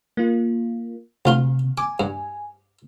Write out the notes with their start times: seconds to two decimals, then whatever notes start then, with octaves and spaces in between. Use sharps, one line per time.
0.17 A#3 F4
1.25 D2 C3 F4 C6
1.78 G#5 D6
2.00 G2